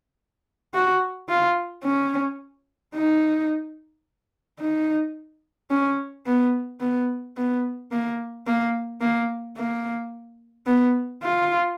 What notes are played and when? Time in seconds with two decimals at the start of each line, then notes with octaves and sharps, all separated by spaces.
0.74 F#4
1.29 F4
1.85 C#4
2.96 D#4
4.60 D#4
5.71 C#4
6.26 B3
6.81 B3
7.37 B3
7.92 A#3
8.47 A#3
9.01 A#3
9.57 A#3
10.67 B3
11.23 F4